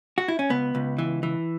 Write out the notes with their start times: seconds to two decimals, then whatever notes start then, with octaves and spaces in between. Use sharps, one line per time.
0.18 F#4
0.28 E4
0.39 C#4
0.50 C#2 B3
0.75 C#2
0.98 E3
1.23 E3